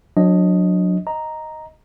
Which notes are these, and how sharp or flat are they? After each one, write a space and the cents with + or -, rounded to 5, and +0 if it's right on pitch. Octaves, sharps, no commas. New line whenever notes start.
F#3 -30 D4 +0 D#5 +0
D#5 +0 A#5 +0